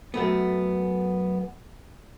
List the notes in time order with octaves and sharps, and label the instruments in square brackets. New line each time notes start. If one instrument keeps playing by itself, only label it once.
[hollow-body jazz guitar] F#2 A3 B3